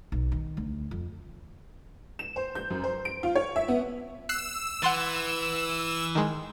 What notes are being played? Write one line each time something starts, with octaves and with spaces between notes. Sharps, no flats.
B1
D#3
D2
F2
E7
C5
G6
F#2
C5
D7
F4
C#5
E5
B3
E6 F#6 C7
E3 F#5 C6 A6
D#3 G#3